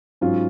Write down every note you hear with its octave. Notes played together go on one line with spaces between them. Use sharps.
G#2 F#3 C#4 F4